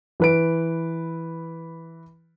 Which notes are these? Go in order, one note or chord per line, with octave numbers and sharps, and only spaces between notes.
E3 B4 D7